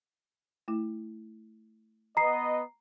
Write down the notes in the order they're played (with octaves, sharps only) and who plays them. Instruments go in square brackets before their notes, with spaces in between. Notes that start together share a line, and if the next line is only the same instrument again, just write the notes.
[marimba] A3 E4
[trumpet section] B3 D#5 [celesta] A#5 C7